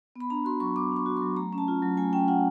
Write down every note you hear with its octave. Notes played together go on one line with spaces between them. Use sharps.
B3 B5
D4 A#5
F#4 C6
F#3 C#6
B3 D6
D4
C#6
F#4
F#3 C6
A3 A#5
C#4
A5
F4
F#3
A3 G#5
C#4 G5
F4 F#5